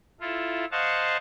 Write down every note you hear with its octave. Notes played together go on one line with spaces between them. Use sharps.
E4 F4 A4
C5 D#5 F5 F#5 A5 C#6